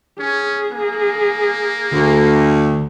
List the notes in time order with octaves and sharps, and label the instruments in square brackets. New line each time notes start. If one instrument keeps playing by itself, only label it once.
[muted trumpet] C#4 [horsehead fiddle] G#4
[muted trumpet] A#3
[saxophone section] D2 [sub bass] D3